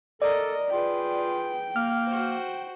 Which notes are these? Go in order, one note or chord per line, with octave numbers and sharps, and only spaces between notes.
A4 A#4 D5 D#5
F4 G#4 B4 G5
A#3 F6
F#4 C5